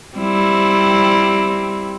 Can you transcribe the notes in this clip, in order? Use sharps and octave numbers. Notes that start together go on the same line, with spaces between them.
G3 C4 E4